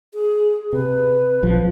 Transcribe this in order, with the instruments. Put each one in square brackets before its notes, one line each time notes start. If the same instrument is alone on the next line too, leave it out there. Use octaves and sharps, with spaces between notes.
[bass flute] G#4
[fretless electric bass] C3 [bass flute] B4
[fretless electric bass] A#1 F3